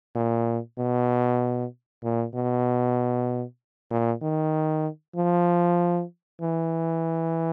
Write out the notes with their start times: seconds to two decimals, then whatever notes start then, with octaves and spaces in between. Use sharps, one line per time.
0.15 A#2
0.78 B2
2.03 A#2
2.34 B2
3.91 A#2
4.22 D#3
5.16 F3
6.41 E3